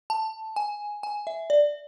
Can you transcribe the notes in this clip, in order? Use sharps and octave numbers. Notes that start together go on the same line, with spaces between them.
A5
G#5
G#5
E5
D5